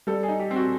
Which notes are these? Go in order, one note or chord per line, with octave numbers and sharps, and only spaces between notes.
G3 A4
G#4
D#4
G4
C4
F#4